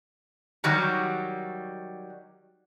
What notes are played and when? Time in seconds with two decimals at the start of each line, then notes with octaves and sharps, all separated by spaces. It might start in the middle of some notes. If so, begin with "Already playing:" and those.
0.64 D#3 F#3 G3 F#4